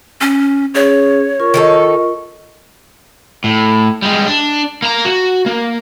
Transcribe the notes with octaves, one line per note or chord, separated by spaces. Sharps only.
C#4
C#4 G#4 C#5
F4 A#4 C#6
D#3 D#4 A4
A2
G3 G#3
D4
A#3 A#5
F#4
A#3